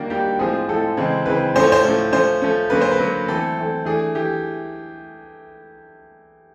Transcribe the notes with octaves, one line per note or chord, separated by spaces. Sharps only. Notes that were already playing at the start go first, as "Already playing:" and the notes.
Already playing: D#3 G3 A#3 D4 F#4
D#3 G3 A#3 D4 G4
A2 F3 G#3 C4 G#4
A2 F3 G#3 C4 A4
C#3 E3 G#3 C4
C#3 E3 G#3 C4 B4
A2 F3 A3 C#4 C5
C#5
C5
A2 F3 A3 C#4
F3 A3 C#4 C5
F3 A3 C#4
D3 F#3 A#3 C#4 B4
C5
B4
D3 F#3 A#3 C#4
E3 A3 C4 A4
E3 A3 C4
E3 A3 D4 G#4
E3 A3 G4